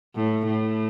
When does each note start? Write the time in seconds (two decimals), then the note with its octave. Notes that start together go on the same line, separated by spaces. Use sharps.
0.15 A2
0.47 A2